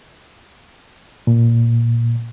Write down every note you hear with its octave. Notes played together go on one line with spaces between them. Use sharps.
A#2